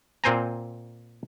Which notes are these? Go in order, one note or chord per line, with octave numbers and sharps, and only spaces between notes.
A#2 C4 C5 G#5 A#5